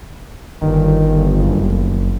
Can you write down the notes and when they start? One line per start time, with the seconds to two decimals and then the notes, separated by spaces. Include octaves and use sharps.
0.61 G1 D#3
1.39 F#1